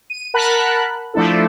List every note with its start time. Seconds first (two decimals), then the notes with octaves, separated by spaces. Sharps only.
0.10 D#7
0.34 A#4 F#5 A5 B5 F#6
1.14 F3 A3 D4 E4 A4